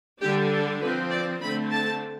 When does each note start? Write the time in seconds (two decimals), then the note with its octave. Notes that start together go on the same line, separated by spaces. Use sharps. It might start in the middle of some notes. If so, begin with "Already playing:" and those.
0.22 D3 G3 D4 G4
0.52 A4
0.81 F3 C4 B4
1.11 D5
1.41 D3 A3 C4 B5
1.70 A5